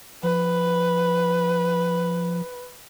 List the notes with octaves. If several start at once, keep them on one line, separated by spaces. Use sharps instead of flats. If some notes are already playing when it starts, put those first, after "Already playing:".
F3 B4